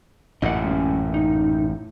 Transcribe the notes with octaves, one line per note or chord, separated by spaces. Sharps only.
A1 F#2 A#2 D#5 F#5
G#3 C#4
D#4